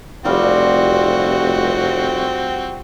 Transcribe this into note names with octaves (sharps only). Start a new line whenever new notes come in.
F1 G3 C4 F4 F#4 F5